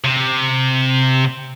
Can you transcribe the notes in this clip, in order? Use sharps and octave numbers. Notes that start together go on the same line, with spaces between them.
C3